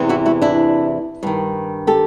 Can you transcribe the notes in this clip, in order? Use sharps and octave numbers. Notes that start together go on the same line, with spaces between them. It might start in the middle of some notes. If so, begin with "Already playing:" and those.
Already playing: E2 C3 E3
E4 F#4
E4 F#4
D4 E4
G2 D#3
G4 A4